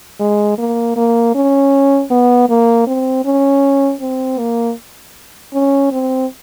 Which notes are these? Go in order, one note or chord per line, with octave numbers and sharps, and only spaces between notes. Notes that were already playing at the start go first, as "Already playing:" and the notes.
G#3
A#3
A#3
C#4
B3
A#3
C4
C#4
C4
A#3
C#4
C4